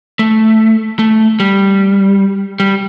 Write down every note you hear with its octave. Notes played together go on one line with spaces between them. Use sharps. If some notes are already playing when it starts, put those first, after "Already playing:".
A3
A3
G3
G3